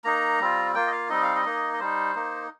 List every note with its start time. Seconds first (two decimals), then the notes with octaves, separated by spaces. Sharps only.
0.04 A#3 D#4 A#5
0.40 G3 C4 F4
0.74 A#3 F4 G5
0.87 D#5
0.92 F5
1.09 G3 C4 D#4 D#5
1.23 F5
1.36 D#5
1.45 A#3 D#4
1.73 D#5
1.80 G3 D#4 C5
2.15 A#3 D#4